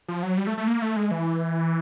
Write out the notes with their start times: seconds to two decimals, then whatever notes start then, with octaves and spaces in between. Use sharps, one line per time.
0.08 F3
0.23 F#3
0.38 G3
0.47 A3
0.58 A3
0.68 A#3
0.82 A3
0.96 G#3
1.11 E3